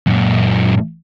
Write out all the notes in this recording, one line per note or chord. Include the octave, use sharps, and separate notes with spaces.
F#2 A#2